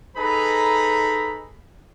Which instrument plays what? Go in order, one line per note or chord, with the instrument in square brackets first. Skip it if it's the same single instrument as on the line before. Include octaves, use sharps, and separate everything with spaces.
[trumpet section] D#4 G#4 A4 B4 A#5 B5